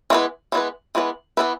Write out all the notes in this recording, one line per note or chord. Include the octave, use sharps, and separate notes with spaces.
E3 G#3 B3 E4 B4
E3 G#3 B3 E4 B4
E3 G#3 B3 E4 B4
E3 G#3 B3 E4 B4